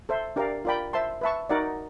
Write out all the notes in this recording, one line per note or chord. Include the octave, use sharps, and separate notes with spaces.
A4 C5 E5
D4 G4 A#4 D5 F5
F4 A#4 D5 G5 B5
C5 E5 A5 C6
B4 E5 A5 C#6
D#4 F#4 A#4 D5 F#5